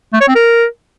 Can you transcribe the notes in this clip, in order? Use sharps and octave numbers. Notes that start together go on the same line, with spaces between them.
A3
C#5
C4
A#4